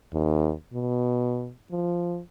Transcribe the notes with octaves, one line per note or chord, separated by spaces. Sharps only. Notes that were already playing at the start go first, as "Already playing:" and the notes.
D#2
B2
F3